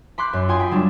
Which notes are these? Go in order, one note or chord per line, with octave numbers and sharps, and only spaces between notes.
B5 C6 D6 F#6 G6
F#2
F4 G5 G#5 C6 D#6
G5 B5
F#3 G3 D4